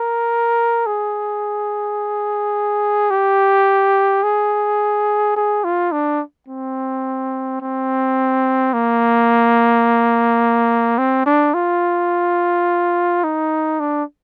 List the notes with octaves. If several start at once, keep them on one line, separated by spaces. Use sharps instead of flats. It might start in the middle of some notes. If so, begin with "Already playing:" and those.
Already playing: A#4
G#4
G4
G#4
G#4
F4
D4
C4
C4
A#3
C4
D4
F4
D#4
D4